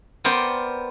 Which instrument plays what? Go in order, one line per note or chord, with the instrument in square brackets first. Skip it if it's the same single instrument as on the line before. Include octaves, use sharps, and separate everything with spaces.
[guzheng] B3 A#4 C5 D5 G5